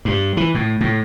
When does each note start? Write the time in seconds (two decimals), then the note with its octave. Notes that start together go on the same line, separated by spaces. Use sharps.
0.05 G2
0.37 E3
0.55 A2
0.81 A2